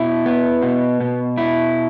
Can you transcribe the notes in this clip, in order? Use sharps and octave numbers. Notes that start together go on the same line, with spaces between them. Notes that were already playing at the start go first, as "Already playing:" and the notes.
Already playing: B2 E4
B3
B2
B2
E4